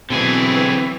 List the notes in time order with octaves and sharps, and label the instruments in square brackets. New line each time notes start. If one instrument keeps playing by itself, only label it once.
[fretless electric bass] B2 [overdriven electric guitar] D3 G#4 [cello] E3 F#3 [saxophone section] C4